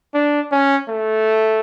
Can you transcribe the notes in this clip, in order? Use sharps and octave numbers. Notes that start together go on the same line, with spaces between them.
D4
C#4
A3